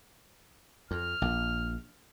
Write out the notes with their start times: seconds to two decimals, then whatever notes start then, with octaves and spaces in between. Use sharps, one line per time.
0.91 F2 F6
1.22 A#1